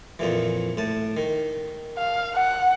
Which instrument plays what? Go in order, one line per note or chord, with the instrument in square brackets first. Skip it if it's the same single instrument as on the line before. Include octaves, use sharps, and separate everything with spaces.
[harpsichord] F2 A#2 E3
A2 A5
D#3
[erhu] F5
F#5